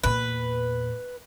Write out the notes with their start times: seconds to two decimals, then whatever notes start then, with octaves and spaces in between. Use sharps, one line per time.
0.04 E2 A#2 B4